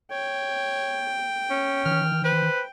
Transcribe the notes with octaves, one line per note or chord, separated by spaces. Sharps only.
C#5 G5
C#4
D#3 E3 F6
B4 C5